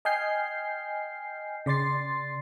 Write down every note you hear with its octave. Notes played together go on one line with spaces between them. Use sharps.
D#5 G5 G#5 F6 G6 C7
C#3 D5 C6 A6 C7